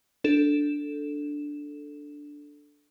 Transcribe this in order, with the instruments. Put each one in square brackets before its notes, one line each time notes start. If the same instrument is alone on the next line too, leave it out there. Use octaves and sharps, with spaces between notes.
[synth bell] D4 A4 E7